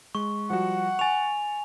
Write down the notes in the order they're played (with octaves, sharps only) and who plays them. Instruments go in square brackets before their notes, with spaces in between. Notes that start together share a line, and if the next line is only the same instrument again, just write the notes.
[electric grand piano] G#3 [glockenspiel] C#6
[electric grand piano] F3 G3 F#4 [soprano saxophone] F#5
[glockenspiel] G#5 F7 [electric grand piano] C#6 A6